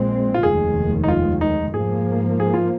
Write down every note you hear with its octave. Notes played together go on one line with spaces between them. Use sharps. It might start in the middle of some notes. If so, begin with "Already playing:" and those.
Already playing: A#1 A#2 G#3 C4
F4
F1 D#2 D#3 G#3 G#4
D#4
F4
D#4
G#2 F3 A#3 G#4
G#4
F4